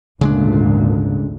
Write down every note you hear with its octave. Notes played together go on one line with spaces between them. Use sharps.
G#1 D2 A#2 C#3 G#3 D4